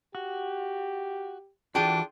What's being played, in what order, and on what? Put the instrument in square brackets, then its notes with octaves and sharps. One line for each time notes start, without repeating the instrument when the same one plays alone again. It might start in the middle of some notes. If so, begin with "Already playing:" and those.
[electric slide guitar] F#4 [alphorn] G4
[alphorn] D3 [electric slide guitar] E3 F#4 [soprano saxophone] D4 [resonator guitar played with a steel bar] F4 G#4 G5